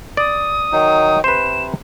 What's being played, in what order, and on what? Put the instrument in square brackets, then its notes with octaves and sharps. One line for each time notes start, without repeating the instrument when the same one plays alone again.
[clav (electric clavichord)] D5 [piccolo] D#6
[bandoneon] D#3 F#3 D#4
[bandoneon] C3 [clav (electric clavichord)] B4 C5 [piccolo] E7